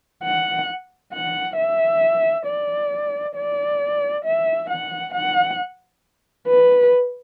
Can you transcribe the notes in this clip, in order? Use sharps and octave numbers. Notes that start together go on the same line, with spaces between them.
F#5
F#5
E5
D5
D5
E5
F#5
F#5
B4